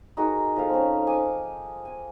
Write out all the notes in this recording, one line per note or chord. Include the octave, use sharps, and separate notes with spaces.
D#4 F#4 G#4 A#4
F3 A4 F5
C4 C#4
G#5 D6 D#6
G#5